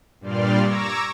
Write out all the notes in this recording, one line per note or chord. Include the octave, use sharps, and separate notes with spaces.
G2 A#2 G3 D5 C6 F6
A#5 C#6 D6 E6 G#6 A#6